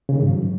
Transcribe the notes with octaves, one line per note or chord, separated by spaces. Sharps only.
C#3
D#3
G#2
F#3